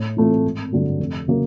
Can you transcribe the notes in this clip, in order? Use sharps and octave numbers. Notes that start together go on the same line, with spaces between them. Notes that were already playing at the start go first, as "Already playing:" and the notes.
Already playing: A2
E3 A3 C4 F4
G#1
G2 D3 F#3 A3
F1
C#3 F#3 A#3